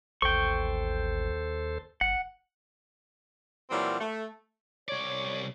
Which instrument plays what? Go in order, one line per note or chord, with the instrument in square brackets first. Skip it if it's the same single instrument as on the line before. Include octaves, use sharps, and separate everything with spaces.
[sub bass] A1 [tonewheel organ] D#2 A4 C5 [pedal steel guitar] G5 C#6
[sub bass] G1 [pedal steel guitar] F#5
[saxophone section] A#2 E3 F#3 G3 A#3 C4
A3
[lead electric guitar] C2 D5 [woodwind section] C#5